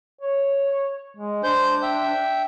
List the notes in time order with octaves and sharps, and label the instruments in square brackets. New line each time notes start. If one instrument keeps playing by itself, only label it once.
[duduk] C#5
G#3
[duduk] D4 [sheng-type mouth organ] C5 G6
[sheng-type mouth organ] E5 G5